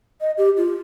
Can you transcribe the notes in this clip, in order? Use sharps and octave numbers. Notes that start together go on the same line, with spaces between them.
D#5
G4
F4